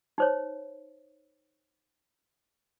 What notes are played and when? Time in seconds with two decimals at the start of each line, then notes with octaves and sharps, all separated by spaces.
0.18 D#4 C5 C#5